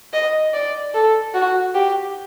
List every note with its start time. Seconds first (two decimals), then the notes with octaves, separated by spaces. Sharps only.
0.13 D#5
0.53 D5
0.94 A4
1.34 F#4
1.74 G4